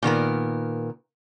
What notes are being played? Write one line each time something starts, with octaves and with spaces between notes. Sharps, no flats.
A#2 D#3 B3 A#4